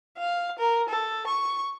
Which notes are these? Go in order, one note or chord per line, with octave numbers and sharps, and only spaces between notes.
F5
A#4
A4
C#6